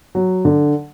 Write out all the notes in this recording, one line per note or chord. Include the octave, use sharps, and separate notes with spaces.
F#3
D3